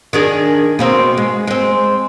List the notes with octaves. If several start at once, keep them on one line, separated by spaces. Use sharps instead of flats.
D#3 D4 G#4
B2 A#3 C4
G#3
G#3 C4